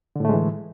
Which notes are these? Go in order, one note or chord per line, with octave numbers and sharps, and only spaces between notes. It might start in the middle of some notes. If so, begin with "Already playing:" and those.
A2 D3 E3 G#3 A3